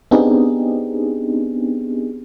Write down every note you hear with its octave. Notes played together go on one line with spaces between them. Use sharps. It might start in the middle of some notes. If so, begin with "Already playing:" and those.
B3 C4 D4 D#4 G4 G#4